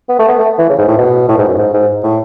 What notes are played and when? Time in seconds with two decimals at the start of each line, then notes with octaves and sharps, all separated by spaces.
0.09 B3
0.19 A3
0.28 B3
0.39 A3
0.58 E3
0.69 C#3
0.78 G#2
0.88 A2
0.98 B2
1.28 A2
1.38 G#2
1.49 F#2
1.59 G#2
1.73 G#2
2.03 A2